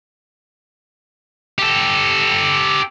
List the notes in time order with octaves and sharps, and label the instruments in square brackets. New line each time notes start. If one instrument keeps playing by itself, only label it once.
[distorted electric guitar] G4 A4